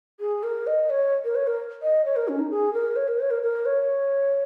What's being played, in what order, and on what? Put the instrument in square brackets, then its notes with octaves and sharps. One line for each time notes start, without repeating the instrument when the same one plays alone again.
[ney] G#4
A#4
D#5
C#5
A#4
C#5
A#4
D#5
C#5
A#4
C#4
D#4
G#4
A#4
C#5
A#4
C#5
A#4
A#4
C#5